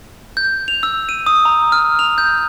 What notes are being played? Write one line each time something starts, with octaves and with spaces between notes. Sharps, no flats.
G6
F7
E6
D#7
D#6
A#5
F6
F7
G6